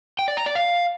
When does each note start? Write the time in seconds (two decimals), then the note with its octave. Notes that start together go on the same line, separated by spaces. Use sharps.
0.19 G5
0.28 D5
0.37 A#5
0.46 D5
0.55 F5